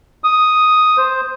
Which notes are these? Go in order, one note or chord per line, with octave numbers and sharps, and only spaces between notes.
D#6
C5